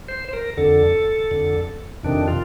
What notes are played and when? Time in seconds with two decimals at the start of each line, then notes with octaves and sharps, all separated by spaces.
0.08 C5
0.29 C5
0.33 A#4
0.57 F2 D3 A4
1.31 F2 D3
2.03 F2 C3 D#3 D4
2.28 F4